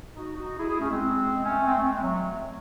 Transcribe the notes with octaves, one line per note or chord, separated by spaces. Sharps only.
D#4 F#4
D#4 F#4
E4 G#4
E4 G#4
A3 C#4
G#3 C4
A3 C#4
C4
A3
G#3
F#3 A3